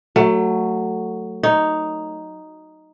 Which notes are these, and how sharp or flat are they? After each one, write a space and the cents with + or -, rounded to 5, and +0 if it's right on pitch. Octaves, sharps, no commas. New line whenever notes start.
F#3 +0 A3 +20
D#4 +0 C#5 +0